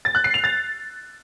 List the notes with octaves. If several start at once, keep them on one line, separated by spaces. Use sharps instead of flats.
A6
F#6
C7
F7
A6